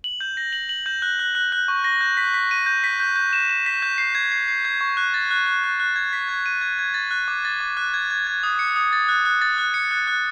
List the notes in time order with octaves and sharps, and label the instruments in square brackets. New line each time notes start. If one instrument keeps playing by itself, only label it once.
[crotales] F#7
G6
A#6
F#7
F#7
G6
F#6
F#6
F#6
F#6
C#6
A#6
G6
B6
B6
D#7
G6
B6
G6
G6
E7
E7
B6
G6
C7
G#6
C7
C7
G#6
C#6
F#6
A6
F#6
F#6
F#6
F#6
G#6
B6
G#6
D#7
G#6
G#6
A6
F#6
D6
A6
D6
F#6
G#6
G#6
G#6
D#6
C#7
D#6
A6
F#6
F#6
A6
F#6
C#7
F#6
F#6